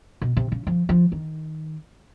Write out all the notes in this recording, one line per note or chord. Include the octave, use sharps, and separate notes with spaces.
B2
C3
C#3
F3
F3
D#3